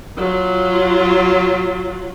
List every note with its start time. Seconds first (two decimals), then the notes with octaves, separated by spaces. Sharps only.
0.17 F#3 F4